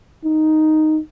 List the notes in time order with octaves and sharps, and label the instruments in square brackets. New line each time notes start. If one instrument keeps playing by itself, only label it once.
[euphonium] D#4